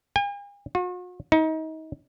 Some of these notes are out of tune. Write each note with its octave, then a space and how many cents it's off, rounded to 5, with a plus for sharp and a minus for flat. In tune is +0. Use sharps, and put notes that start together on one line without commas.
G#5 -45
F#4 -45
D#4 +30